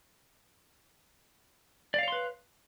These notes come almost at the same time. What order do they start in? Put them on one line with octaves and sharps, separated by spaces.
D5 F5 C#5 C6 B4